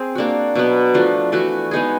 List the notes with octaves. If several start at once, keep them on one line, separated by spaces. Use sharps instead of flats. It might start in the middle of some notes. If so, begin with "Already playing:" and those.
Already playing: C4 G#4
A#3 D4 F#4
B2 F#3 B3
F3 A3 D4 F#4
E3 A3 D4 F#4
G#3 B3 D#4 G#4